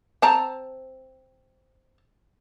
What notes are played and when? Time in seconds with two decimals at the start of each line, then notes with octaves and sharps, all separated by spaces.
0.22 C4 A5 A#5